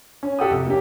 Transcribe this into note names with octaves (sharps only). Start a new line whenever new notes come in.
C#4
F#4 G4 A4 F#5 G5 D#6
F2 C3
A#3 C#4 G4